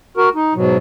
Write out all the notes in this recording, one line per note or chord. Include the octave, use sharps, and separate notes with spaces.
F#4 A#4
D#4
G#2 B2 F#3